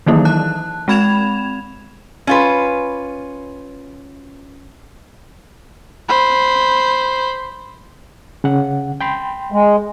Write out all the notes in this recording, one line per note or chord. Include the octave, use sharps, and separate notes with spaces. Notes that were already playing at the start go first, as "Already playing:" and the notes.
D#3 E3 F#3 A#3 D#4 E4
A5 F#6
G#3 C4 B5 G#6 E7 F7
C#4 F4 B4
C5 B5
C#3 F#5
G5 B5 C6
G#3